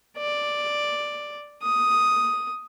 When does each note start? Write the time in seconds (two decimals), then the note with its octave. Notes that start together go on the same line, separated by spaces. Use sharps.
0.18 D5
1.63 D#6